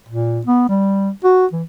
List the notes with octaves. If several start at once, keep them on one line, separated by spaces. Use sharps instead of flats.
A#2
B3
G3
F#4
E3